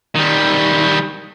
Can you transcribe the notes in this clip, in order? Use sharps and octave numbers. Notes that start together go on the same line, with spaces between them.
D#3 G3